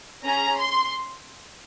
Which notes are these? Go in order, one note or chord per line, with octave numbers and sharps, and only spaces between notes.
C#4 G#4 A#5
C6